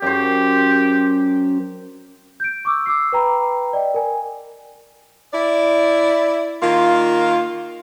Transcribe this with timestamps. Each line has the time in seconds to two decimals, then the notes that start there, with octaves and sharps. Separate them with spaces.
0.02 F#2 G4 C5
2.40 G6 D7
2.65 C#6 D6 E6
2.86 D6 E6 C7
3.12 B4 G5 A#5 B5
3.73 D5 D#5 G5
3.94 A#4 G#5
5.33 E4 D5
6.63 D#3 A#3 F4